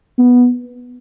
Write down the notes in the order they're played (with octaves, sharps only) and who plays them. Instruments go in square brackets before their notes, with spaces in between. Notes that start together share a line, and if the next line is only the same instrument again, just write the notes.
[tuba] B3